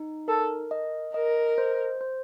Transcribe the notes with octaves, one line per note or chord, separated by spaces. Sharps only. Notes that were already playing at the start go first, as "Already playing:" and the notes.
Already playing: D#4
A4 A#4
D#5
A#4 D#5
C5
C5